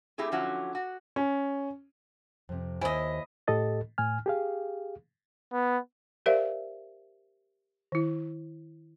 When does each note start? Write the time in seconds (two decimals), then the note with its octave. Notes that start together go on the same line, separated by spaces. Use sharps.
0.18 A3 C4 E4 G4 G#4
0.32 D3 F3 F#3 C#4 E4 F#4
0.75 F#4
1.16 C#4
2.49 F2 C3
2.81 D#2 E4 C5 D#5 G#5
3.48 A2 G4 A4 D#5 A6
3.98 A2 G#5 F6
4.26 G4 G#4 F5
5.52 B3
6.26 G4 A#4 C5 D5 E5 F5
7.92 D#3 E4